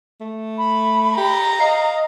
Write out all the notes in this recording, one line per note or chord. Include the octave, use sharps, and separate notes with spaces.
A3
B5
G4 A#5
D#5 F5